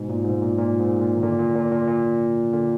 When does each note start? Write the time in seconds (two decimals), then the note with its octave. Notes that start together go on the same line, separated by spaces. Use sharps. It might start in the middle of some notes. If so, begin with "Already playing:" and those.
Already playing: G#2 B2
0.09 A#2
0.25 G#2
0.42 A#2
0.58 A#2
0.79 G#2
1.01 A#2
1.15 D#3
1.22 A#2 D3
1.39 A#2
1.55 A#2
1.71 A#2
1.88 A#2
2.53 A#2 D3